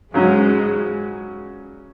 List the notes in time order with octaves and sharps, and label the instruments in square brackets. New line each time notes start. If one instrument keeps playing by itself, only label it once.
[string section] G#2 G#3 [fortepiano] C#3 F#3 C#4 F#4